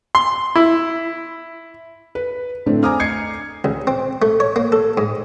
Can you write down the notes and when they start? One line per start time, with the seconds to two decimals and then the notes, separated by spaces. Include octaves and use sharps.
0.15 C6
0.56 E4
2.15 B4
2.66 A2 D3 A3 C4 D4
2.83 G#5 A#5 D6 D#6 F6
3.00 D#5 G#6 C7 C#7
3.64 C#2
3.87 C4
4.22 A3
4.40 C#5
4.56 A#3
4.72 A4
4.97 G#2